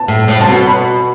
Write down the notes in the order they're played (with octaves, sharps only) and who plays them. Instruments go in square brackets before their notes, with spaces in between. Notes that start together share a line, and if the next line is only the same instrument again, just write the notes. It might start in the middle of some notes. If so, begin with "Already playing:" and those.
Already playing: [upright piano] A5
[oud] A2
A2
[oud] C3 [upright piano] A5
[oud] B2
[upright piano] B5